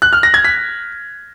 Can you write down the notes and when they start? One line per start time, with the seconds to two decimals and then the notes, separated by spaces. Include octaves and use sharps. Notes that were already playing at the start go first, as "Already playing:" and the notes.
0.02 F#6
0.13 F6
0.23 A#6
0.34 G#6
0.44 B6